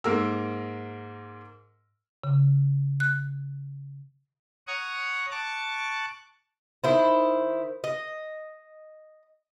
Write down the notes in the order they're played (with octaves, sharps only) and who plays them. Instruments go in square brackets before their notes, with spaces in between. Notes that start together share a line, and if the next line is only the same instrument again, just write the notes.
[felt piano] G#2 A#3 A#4 E6
[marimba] C#3
F#6
[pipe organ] C#5 F#5 A#5 C#6 D#6
A5 C#6 D6 F#6 A6
[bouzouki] D#3 E4 C5
D#5